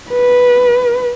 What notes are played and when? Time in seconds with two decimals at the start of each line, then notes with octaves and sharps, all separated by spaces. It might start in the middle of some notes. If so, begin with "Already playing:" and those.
0.10 B4